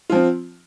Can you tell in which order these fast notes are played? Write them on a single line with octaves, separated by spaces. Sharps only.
F4 F3 C4